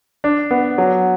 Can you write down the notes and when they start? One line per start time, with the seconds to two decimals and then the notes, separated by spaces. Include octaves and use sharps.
0.24 D4
0.51 B3
0.78 F#3